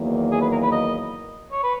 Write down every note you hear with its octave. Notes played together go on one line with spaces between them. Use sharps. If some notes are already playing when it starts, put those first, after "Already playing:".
Already playing: E2 D#3 F#3 A#3
G#4
B4
A#4
B4
D#5
C#5
B4